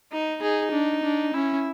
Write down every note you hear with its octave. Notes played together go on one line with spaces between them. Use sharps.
D#4
D#4 G#4
D4
D4
C#4 E4